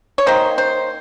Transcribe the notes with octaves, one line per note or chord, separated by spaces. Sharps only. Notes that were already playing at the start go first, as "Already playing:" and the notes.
C#5
D#3 A#3 C5
C5